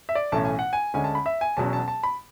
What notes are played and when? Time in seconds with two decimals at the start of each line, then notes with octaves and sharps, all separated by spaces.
0.09 E5
0.15 D5
0.32 B1 A2 E3 A3 C#4 A5
0.45 G#5
0.59 F#5
0.73 G#5
0.94 D2 D3 G#3 C#4 G#5
1.04 A5
1.15 B5
1.26 E5
1.41 G#5
1.57 E1 E2 B2 F#3 C#4 A5
1.73 A5
1.88 A5
2.03 B5